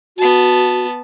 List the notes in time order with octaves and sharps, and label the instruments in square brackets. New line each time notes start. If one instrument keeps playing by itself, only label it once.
[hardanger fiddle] B3 A5 [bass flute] F#4